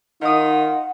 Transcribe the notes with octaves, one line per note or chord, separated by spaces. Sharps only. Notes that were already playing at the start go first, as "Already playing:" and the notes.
D#3 D#4 F4 F#5 D#6